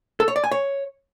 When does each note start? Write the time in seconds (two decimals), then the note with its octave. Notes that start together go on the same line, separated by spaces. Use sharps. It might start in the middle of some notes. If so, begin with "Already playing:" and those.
0.20 A4
0.28 C#5
0.36 D5
0.44 G#5
0.51 C#5